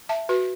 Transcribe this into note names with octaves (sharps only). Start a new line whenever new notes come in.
E5 A5
F#4 B4